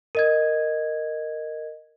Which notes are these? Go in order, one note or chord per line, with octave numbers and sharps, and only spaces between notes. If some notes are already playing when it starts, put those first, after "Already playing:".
A#4 D#5 G#6